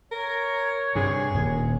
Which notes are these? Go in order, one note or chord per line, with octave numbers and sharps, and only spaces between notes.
A#4 C#5
G2 C3 G#4
D#1